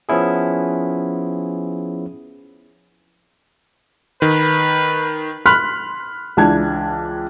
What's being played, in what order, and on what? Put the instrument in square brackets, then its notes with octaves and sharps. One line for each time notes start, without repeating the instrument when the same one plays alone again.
[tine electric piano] F3 B3 C#4 E4 G#4
[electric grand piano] D#3 [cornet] B4
[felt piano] B5 C6 F6 F#6 B6
C#2 E3 D4 A5 G#6